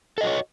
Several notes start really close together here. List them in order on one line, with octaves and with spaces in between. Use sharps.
A4 D#5 F#4 C#5